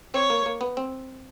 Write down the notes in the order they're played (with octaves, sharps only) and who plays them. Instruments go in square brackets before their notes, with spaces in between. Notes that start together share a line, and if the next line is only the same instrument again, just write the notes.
[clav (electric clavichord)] C4 [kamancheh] C#5
[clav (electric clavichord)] A#3
A#3
B3
C4